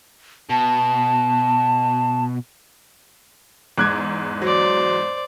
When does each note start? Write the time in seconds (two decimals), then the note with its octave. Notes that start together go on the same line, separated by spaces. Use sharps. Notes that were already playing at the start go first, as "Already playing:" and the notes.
0.50 B2 A5
3.78 E2 G#2 D6 F#6 G#6
4.42 F#3 C5 D5